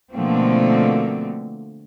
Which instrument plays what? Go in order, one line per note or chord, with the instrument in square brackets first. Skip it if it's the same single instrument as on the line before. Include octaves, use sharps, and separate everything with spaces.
[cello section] B2 D3 F3 A3 A#3 C4